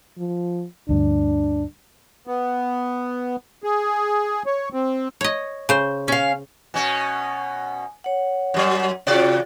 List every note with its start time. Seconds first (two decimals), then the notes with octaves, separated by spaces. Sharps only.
0.18 F3
0.89 D2 G2 D4
2.27 B3
3.63 G#4
4.46 C#5
4.73 C4
5.21 C#5 D#5
5.69 C#3 C5
6.08 C#4 F5
6.74 B2 C#4 G#5
8.04 C#5 F#5
8.54 F#2 F#3
9.07 C3 F4 F#4 D5 G5